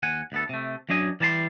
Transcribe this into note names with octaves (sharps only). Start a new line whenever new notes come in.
D#2 F#5 G#5
D2 B3 A4
C3 A3
F#2 F#3 D4 D#5 G#5
E3 G3 A5 A#5 C6